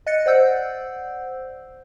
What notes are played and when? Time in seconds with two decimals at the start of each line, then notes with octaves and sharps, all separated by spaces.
0.07 D#5 F#6 A6 C#7
0.26 C5 D5 F#5 E6 G6